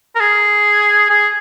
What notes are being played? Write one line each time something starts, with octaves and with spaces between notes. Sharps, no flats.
A#4
G#4
G#4